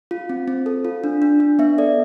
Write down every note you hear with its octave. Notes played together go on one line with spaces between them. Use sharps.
F4
C4
C4
A4
F4
D4
D4
D4
B3 E5
A4 D5